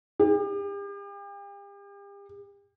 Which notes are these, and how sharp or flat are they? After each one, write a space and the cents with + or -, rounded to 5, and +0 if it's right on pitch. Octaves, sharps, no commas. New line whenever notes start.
G4 +40